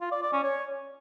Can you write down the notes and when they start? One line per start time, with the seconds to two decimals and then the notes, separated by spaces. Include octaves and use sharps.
0.01 F4
0.11 D5
0.22 D5
0.33 C#4
0.43 C#5